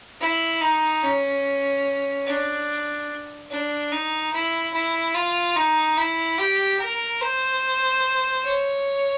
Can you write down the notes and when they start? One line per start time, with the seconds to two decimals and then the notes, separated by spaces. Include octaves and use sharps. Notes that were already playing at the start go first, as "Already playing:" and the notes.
0.21 E4
0.62 D#4
1.03 C#4
2.26 D4
3.51 D4
3.91 D#4
4.33 E4
4.73 E4
5.15 F4
5.56 D#4
5.98 E4
6.38 G4
6.80 A#4
7.21 C5
8.45 C#5